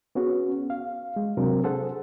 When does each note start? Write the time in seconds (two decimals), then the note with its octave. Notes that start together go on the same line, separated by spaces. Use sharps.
0.15 B3 C#4 F#4 G#4
0.70 F5
1.16 G#3
1.37 C3 F#3 C4 D4 A#4
1.64 G#4 A4 C5 F#5